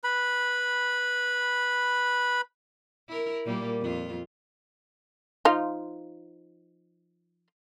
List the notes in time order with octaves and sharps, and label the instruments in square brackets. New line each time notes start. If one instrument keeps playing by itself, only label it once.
[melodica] B4 B5
[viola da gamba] E4 A#4
A#2 G3 A#3
F2 F4
[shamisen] F3 D#4 F4